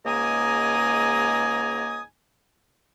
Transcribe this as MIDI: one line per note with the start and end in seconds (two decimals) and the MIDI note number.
0.05 2.01 37
0.05 2.01 44
0.05 2.01 58
0.05 2.01 80
0.05 2.01 82
0.05 2.01 87